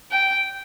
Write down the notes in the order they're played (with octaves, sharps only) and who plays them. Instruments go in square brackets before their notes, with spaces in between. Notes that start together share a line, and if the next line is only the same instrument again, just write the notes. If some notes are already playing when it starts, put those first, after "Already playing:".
[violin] G5